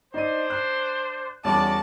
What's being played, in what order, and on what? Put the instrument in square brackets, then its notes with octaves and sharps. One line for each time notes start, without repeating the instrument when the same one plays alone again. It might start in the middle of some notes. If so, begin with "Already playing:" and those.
[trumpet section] D4 C5 [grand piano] D#4 D5 D#7
[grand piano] F#6
[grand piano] E2 G3 C#4 [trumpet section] F#4 D5 [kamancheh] A5